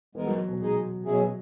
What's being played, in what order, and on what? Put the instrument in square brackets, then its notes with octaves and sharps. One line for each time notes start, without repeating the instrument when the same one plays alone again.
[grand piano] E3 [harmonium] G#3 B3 D#4 A#4
[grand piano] F#3
B2
[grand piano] B2 [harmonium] G#3 D#4 G#4 D#5
[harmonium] B2 F#3 C#4 E4 G#4